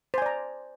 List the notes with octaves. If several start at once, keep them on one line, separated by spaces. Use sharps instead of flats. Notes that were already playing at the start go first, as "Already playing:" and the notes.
C5 D5 G#5 A#5